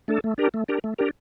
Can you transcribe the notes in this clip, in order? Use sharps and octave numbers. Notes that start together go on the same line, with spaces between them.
A3 D4 A4
A3
D4 G4 A#4
A3
D4 G4 A#4
A3
D4 G4 A#4